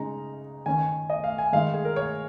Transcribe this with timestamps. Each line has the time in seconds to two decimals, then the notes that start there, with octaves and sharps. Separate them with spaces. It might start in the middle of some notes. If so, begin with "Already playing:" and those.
Already playing: C#3 G#3 D#4 A#5
0.66 D#3 C#4 G#5
1.10 D#5
1.24 F5
1.38 G#5
1.52 D#3 G#3 D#4 F5
1.74 G#4
1.85 A#4
1.96 C#5